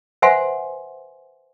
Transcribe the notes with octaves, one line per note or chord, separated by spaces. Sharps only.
B4 C5 E5 F#5 G#5 C6